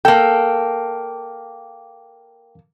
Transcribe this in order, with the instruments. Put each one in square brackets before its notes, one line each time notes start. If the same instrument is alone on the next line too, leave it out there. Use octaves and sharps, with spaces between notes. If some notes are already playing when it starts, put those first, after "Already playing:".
[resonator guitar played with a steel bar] A#3 A4 [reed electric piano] G5